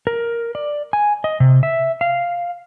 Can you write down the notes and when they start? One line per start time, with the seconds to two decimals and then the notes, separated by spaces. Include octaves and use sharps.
0.07 A#4
0.55 D5
0.93 G#5
1.24 D#5
1.40 C3
1.63 E5
2.01 F5